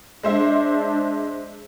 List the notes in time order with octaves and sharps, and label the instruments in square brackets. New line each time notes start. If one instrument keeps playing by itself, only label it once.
[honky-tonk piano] G#3 C5 E5 [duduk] D4